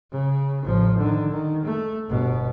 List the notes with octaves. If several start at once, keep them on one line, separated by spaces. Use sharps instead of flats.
C#3
A1 F3
D3 D#3
D#3
A3
G1 B2